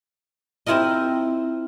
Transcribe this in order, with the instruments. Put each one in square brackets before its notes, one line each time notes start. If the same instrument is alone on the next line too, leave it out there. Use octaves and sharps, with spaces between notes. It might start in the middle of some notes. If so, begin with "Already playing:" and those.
[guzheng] C4 E4 F4 A#4 D#5